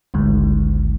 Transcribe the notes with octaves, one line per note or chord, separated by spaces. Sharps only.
G#1 D2 G#2